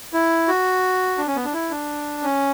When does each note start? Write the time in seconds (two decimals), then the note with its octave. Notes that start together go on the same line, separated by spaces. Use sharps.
0.13 E4
0.48 F#4
1.18 D4
1.27 C#4
1.36 B3
1.44 D4
1.54 E4
1.71 D4
2.23 C#4